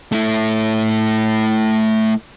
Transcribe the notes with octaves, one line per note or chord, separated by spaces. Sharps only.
A3 E4